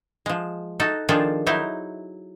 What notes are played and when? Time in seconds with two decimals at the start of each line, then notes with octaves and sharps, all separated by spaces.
0.26 F3 G#3
0.80 D#4 F#4 A4
1.09 D#3 F3 D4 F4 G#4 A4
1.46 F#3 D#4 E4 C5